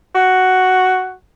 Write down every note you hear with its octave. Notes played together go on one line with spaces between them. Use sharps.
F#4